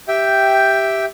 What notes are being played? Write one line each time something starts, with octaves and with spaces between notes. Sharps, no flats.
G4 E5 G5